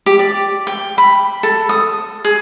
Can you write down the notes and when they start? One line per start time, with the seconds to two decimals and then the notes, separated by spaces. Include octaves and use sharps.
0.06 G4
0.19 D5
0.67 G5
0.98 B5
1.43 A4
1.69 D#6
2.25 G#4